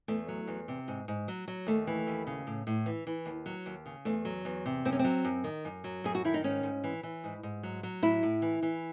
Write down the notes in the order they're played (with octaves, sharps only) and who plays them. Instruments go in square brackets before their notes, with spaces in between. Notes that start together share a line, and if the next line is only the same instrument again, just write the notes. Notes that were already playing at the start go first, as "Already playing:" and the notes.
[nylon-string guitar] E2 A3
F#3
E2
C3
G#2
G#2
F#3
F#3
D#2 A3
E3
D#2
C#3
A2
A2
E3
E3
D#2
F#3
D#2
C#3
E2 A3
F#3
E2
C3
F#2 C4
C#4
F#3 C4
F#2
D#3
F#2
F#3
F#2 G#4
F#4
D#3 E4
D#4
G#2 C#4
G#2
E3
E3
G#2
G#2
F#3
F#3
A2 E4
A2
E3
E3